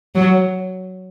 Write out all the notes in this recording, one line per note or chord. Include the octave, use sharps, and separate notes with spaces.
F#3